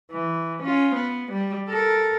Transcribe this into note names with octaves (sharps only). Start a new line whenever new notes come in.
E3
C#4 F4
B3
G3
A4 A#4